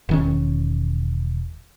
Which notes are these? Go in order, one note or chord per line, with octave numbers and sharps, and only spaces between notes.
E1 D#3 C#4